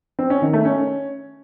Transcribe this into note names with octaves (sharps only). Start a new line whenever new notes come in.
C4
C#4
D#3
A3
C#4